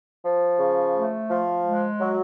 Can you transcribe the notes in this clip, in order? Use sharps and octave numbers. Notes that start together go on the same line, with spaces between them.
F3
C#3
A3
F3
G#3
F#3